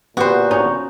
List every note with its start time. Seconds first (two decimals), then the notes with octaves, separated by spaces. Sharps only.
0.17 A#2 B3 F#4 G4 B4 C5
0.51 C#4 D#4